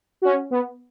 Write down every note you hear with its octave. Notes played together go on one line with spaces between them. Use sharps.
C#4 F#4
B3